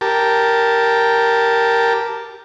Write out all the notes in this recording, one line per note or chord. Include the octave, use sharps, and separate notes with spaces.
G4 A#4 A5